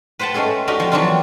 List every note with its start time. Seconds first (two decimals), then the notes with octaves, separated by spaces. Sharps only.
0.19 B4 C5 F#5 G5 A5
0.34 G#3 A3 C#4 G#4 A4
0.67 D4 F#4 G4 A#4 D#5 A#5
0.80 F3 C4
0.92 E3 F#3 A#3 C4 D4 F4